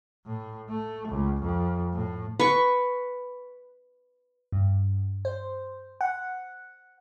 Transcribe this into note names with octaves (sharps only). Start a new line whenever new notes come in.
A2
A3
C#2
F2
A2
B4 C#6
G2
C5
F#5